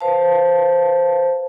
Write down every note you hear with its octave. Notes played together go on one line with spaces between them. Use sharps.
B4 C5 F5 A5